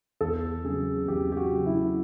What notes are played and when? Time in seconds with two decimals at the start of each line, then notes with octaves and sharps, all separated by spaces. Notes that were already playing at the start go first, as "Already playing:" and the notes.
0.21 E2 A4
0.64 C#3 F#3 G#4
1.08 E2 G4
1.32 G4
1.37 F#4
1.51 C#3 F#3
1.66 E4